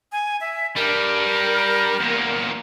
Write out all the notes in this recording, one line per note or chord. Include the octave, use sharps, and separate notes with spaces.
G#5
E5
G3 D4 A#4
E2 A#2